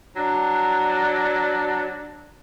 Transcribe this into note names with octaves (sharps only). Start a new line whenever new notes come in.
F#3 D4